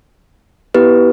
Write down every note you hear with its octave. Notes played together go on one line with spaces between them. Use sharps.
B3 E4 G4 B4